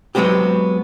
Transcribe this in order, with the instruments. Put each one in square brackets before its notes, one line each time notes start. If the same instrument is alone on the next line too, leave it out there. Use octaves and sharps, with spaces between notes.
[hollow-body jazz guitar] F#3 G#3 B3 C4 G4